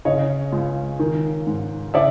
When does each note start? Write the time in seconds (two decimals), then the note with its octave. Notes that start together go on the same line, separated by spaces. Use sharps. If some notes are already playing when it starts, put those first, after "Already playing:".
0.05 C#3 C#5 D#5
0.52 C#2
0.99 D#3
1.47 G#2
1.94 C#3 D5 E5